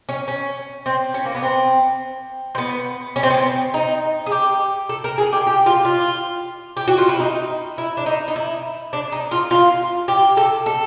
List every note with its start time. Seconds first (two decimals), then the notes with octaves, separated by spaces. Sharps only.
0.09 C#4
0.28 C#4
0.86 C4
1.14 C#4
1.26 A#3
1.35 B3
1.43 C4
2.55 C4
2.58 B3
3.16 C#4
3.23 C4
3.30 B3
3.38 C4
3.74 D#4
4.26 G#4
4.31 G4
4.89 A4
5.04 A#4
5.18 G#4
5.33 G4
5.47 G4
5.66 F4
5.85 F4
6.77 G4
6.88 F#4
6.98 F4
7.09 E4
7.19 D#4
7.78 E4
7.97 D4
8.06 D#4
8.28 D#4
8.36 E4
8.93 D4
9.12 D#4
9.31 F4
9.51 F4
10.08 G4
10.37 A4
10.66 A4